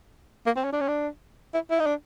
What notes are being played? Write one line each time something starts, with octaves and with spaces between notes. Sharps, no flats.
A#3
C4
C#4
D4
C#4
D4
E4
E4
D#4
D4